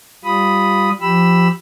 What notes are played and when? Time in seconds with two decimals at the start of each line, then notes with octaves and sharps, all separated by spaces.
0.24 G3 F4 B5 D#6
1.01 F3 G4 B5 E6